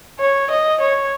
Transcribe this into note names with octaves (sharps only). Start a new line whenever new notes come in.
C#5
D#5
C#5